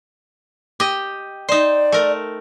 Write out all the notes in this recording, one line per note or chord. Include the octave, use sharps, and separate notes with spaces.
G4 D#5
D#4 C5 D5
A3 A#4